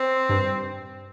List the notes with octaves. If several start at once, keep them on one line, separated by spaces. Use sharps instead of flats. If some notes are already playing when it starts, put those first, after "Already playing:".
Already playing: C4
G2